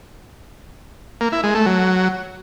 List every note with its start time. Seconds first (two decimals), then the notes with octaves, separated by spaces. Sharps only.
1.21 A#3
1.32 E4
1.43 G#3
1.55 A3
1.66 F#3